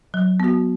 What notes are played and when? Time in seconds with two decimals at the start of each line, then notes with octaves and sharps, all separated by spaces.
0.14 F#3
0.40 B3 F#4